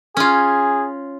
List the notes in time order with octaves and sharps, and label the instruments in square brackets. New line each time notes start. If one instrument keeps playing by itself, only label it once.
[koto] C#4 F4 [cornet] G#4